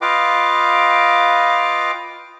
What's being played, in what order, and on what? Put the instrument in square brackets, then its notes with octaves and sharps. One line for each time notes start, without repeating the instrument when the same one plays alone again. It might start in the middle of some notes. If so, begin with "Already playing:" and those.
[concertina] F4 B4 D#5 F5 G5 D6